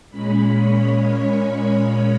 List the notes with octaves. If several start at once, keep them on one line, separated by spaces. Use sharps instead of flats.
A#2 G#3 C#4 B5
C#5